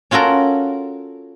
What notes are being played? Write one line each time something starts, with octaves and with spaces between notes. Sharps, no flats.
C#4 F4 F#4 A4 A#4